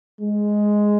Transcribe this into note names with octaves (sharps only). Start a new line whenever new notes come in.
G#3